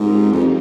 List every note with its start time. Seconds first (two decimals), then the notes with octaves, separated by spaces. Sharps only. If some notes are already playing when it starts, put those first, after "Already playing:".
Already playing: G#2 C4 C#4 D#4 F4 G4 A#4
0.32 F2